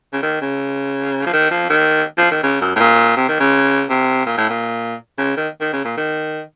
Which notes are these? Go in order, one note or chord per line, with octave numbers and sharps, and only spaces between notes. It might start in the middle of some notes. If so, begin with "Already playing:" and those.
C#3
D#3
C#3
F3
D#3
F3
D#3
F3
D#3
C#3
F#2
A2
A#2
C3
D#3
C#3
C3
A#2
A2
A#2
C#3
D#3
D#3
C#3
A#2
D#3